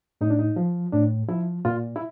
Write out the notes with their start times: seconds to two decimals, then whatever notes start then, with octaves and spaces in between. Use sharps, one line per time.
0.21 A2 D#4
0.30 D4
0.39 D#4
0.56 F3
0.93 A2 D4
1.29 F3 E4
1.65 A#2 F4
1.96 E4